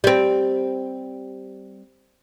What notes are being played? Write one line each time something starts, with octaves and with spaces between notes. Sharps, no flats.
G3 C4